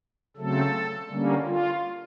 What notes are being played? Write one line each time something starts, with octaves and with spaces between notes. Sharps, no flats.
C#3 F#3 A3 C4 A4
D3 G3 A#3 C#4
F4